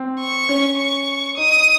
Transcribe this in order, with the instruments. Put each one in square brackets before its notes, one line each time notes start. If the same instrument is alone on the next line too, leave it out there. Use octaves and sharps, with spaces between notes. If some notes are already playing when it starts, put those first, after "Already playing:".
Already playing: [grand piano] C4
[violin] C#6
[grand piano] C#4
[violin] C#6
[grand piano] D#4 [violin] D#6